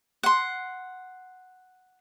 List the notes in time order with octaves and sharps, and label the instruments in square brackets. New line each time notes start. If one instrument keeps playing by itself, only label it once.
[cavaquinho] F#5 C6